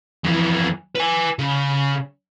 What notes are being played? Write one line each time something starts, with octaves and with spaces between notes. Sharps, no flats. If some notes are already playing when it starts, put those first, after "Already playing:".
F2 E3
B4 G#5
C#3